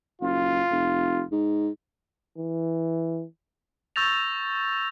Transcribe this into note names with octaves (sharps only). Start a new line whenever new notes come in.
F#1 F4
F1
G#2
E3
C#6 E6 G6 A6 A#6 F7